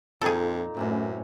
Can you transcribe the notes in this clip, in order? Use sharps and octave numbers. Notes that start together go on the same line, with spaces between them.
F2 A#2 D#3 G#4 A4 A#5
F#2 A2 C3 E3 C#4